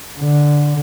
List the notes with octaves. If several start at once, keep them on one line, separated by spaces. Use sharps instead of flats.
D3